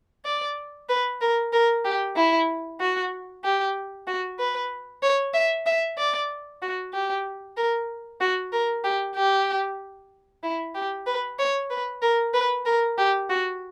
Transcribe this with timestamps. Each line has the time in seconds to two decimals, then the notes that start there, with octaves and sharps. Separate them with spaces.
0.25 D5
0.89 B4
1.21 A#4
1.53 A#4
1.85 G4
2.16 E4
2.80 F#4
3.44 G4
4.07 F#4
4.39 B4
5.02 C#5
5.34 E5
5.66 E5
5.98 D5
6.62 F#4
6.93 G4
7.57 A#4
8.21 F#4
8.52 A#4
8.84 G4
9.16 G4
10.43 E4
10.75 G4
11.07 B4
11.39 C#5
11.70 B4
12.02 A#4
12.34 B4
12.66 A#4
12.98 G4
13.30 F#4